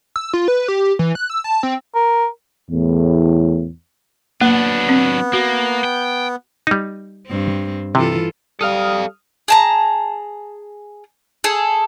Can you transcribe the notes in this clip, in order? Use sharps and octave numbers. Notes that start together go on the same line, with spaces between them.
E6
F4
B4
G4
E3
F#6
E6
A5
C4
A#4
E2 A2
F#3 A#3 B3 D4
C4
A#3 F#4
G5
G3 D#4
G2 C4
C3 E3 F4 A4
G3 A4 F5 D#6 F6
G#4 A5 A#5
G#4 A4